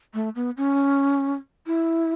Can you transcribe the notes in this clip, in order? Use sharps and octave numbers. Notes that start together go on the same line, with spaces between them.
A3
B3
C#4
E4